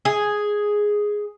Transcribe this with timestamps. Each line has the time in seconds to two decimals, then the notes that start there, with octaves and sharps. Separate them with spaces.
0.05 G#4